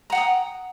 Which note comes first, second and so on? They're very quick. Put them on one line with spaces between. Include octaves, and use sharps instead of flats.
A#5 F#5 G5 D#6